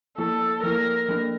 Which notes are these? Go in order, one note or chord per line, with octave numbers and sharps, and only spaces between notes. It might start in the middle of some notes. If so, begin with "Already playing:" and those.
F3 A#3 E4 A4
F3 A#3 E4 A#4
F3 A#3 D4 A4